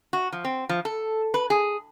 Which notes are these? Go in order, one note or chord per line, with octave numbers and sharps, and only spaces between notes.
F#4
F3
C4
F3
A4
B4
G#4